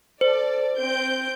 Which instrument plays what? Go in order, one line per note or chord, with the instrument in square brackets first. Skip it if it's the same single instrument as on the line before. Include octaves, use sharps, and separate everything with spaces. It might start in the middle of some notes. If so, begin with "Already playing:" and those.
[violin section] A4 D5 [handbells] C5
[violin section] C4 G6 D7